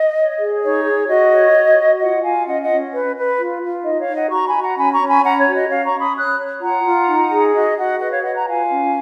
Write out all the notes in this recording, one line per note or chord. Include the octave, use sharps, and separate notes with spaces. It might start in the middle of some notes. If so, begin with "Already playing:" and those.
Already playing: D#5
C#5
G#4
D#4 C#5
G#4
F#4 D#5
C#5
F#4
F#4
F4 D#5 F#5
F4 F5 G#5
C#4 D#5 F#5
D#5 F#5
C#4
B4
B4
F4
F4
D#4 D#5
C#5 F5
D#4
D#5 F#5
F#4 A#5 C#6
G#5 B5
F#4
F#5 A#5
C#4 G#5 B5
A#5 C#6
C#4
G#5 B5
C#4 F#5 A#5
C#5
F#4
D#5
C#4 C#5 F5
A#5 C#6
C#4
B5 D#6
C#5 D#6 F#6
C#5
F4 F#5 A#5
F4
D#4
G#4
F#4 D#5
F#4 D#5 F#5
B4 D#5 F#5
C#5 F5
B4 D#5 F#5
F#5 A#5
F4 F5 G#5
C#4